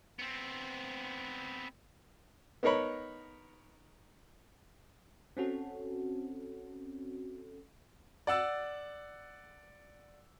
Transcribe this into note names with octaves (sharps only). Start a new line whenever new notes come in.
B3 C4
B3 D#4 A#4 C#5 B5
C4 C#4 F#4 A4
D5 F#5 E6 A6